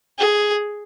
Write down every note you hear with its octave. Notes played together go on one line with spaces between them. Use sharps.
G#4